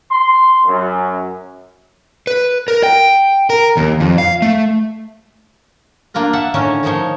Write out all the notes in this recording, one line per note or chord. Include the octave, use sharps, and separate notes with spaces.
C6
F#2
B4
A#4
G5
A#4
D#2
F2
F5
A3
A#3 D4 F4 A#4
E5 F#5 A5
A2 D3 D#3 C#4 A#4 C#5
D#3 F3 D#4 C5 C#5